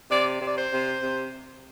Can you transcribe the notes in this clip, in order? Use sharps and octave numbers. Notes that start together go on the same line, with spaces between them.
C3 D5
C3
D5
C5
C3
C3